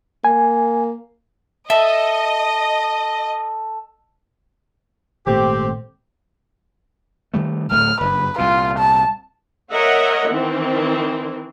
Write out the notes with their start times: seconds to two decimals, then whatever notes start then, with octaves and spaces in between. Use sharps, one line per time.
0.25 A#3 G#5
1.70 A4 D#5 E5
5.27 G#1 A#2 A3 C4 G4
7.34 D#3 G3 A3
7.71 D1 A2 A3 F6
8.00 F#1 G2 B4
8.38 C2 A#2 F4
8.78 A5
9.72 A#4 C#5 D#5 E5 F#5
10.31 D#3 E3 C4